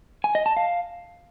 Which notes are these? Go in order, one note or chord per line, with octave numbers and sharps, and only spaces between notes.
G#5
D#5
A5
F5